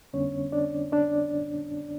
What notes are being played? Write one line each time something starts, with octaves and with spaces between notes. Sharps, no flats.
F2 D3 G3 B3 C#4 D4 C#5
D4 D5
D4 D5